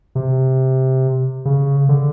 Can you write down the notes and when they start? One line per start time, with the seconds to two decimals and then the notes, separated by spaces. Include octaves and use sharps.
0.15 C3
1.45 C#3
1.89 D3